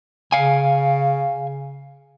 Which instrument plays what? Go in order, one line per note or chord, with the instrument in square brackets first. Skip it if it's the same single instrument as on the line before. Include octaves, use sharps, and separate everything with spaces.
[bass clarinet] C#3 [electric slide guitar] F5 G#5